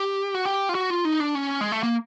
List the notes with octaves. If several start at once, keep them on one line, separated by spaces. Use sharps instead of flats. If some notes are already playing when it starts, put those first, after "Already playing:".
Already playing: G4
F#4
G4
F4
F#4
F4
D#4
D4
C#4
G#3
A3
A#3